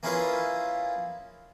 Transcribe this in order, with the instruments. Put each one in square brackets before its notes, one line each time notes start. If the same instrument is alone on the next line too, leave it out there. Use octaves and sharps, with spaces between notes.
[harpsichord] A#3 C#4 E4 F4 G#4 B4